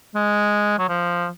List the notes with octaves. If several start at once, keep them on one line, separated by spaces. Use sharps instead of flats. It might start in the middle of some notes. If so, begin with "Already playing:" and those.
G#3
F#3
F3